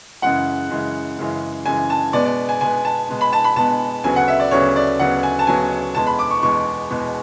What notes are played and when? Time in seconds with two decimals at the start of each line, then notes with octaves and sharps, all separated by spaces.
0.22 F#2 C#3 E3 G#3 F#5
0.70 F#2 C#3 E3 G#3
1.18 F#2 C#3 E3 G#3
1.65 F#2 C#3 E3 G#3 G#5
1.90 A5
2.13 B2 G#3 B3 D5
2.25 D5
2.49 G#5
2.61 B2 G#3 B3 G#5
2.85 A5
3.08 B2 G#3 B3
3.21 B5
3.33 A5
3.44 B5
3.56 B2 G#3 B3 A5
4.04 D2 C#3 F#3 B3 G#5
4.16 F#5
4.28 E5
4.40 D5
4.51 D2 C#3 F#3 B3 C#5
4.76 D5
4.99 D2 C#3 F#3 B3 F#5
5.23 G#5
5.39 A5
5.47 D2 C#3 F#3 B3 G#5
5.95 E2 B2 G#3 B3 A5
6.07 B5
6.19 D6
6.31 C#6
6.43 E2 B2 G#3 B3 C#6
6.90 E2 B2 G#3 B3